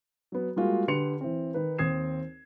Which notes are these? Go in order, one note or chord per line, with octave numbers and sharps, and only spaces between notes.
F#3 B3
G3 G#3 A#3 F4 F#4
D3 G4 B4 C6 C#7 F7
E3 C4
D#3 D#4 B4
D#2 C4 D#6 G#6 C7 E7